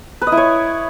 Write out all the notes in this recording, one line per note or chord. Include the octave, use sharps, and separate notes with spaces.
B4
D#5
E4
C#5